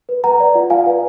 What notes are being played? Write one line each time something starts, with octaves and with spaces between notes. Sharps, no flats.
B4
B4 F#5 A#5
D5
F4
F4 F5 G#5
B4